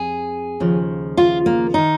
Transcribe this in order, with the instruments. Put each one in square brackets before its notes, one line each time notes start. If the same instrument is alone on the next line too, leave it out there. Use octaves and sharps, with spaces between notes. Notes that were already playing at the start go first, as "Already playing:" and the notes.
Already playing: [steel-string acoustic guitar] F2 G#4
D#2 C#3 F3
F4
A#3
D#3 D#4